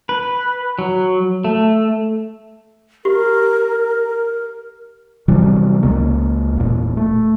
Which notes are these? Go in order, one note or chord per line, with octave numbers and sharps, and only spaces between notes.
B4
F#3
A3
G4 A#4
C3 E3 F#3 G3
C#2 C#3 G#3 A#3
E1 A#2
A3